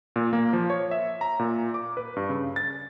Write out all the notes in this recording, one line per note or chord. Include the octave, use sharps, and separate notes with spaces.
A#2
A#3
F3
C#5
E5
A#5
A#2
D6
B4
G2
C#3
A6